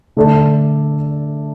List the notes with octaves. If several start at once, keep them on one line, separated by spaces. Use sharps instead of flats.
D3 A3 D4 A4 D5